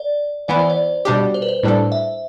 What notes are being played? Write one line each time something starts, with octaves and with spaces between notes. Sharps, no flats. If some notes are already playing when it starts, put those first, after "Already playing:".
Already playing: D5
E3 B3 E4 D5
C5
D5
B2 G3 D4 G4
C5
B4
C5
A2 G3 D4 A4
E5